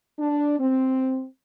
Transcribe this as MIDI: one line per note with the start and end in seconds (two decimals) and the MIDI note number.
0.19 0.55 62
0.59 1.24 60